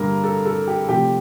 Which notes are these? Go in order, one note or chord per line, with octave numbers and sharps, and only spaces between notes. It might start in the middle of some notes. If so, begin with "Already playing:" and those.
Already playing: G2 D3 G3 A#3 A#4
A4
A4
G4
C3 F3 A3 G4